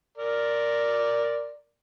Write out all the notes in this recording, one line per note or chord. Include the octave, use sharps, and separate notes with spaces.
A#4 D5